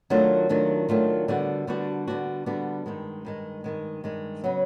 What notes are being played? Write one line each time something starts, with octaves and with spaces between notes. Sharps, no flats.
D#3 F#3 A3 D4 F4
D#3 F#3 A3 D4 F4
D#3 F#3 A3 D4 F4
D3 G3 B3 D4 F#4
D3 G3 B3 D4 F#4
D3 G3 B3 D4 F#4
D3 G3 B3 D4 F#4
G2 D#3 G#3
G2 D#3 G#3
G2 D#3 G#3
G2 D#3 G#3
C#3 F#3 B3